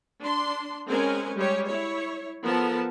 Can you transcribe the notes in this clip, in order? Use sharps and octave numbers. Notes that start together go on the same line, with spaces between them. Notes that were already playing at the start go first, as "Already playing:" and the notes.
D4 C6
G#3 C4 C#4 A#4 B4 G#5
G3 G#3 G4 C#5
E4 C#5
F3 B3 A4 A#4 A5